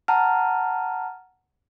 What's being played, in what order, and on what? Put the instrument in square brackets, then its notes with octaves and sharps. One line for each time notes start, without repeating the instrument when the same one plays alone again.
[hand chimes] F#5 A5 A#5 F6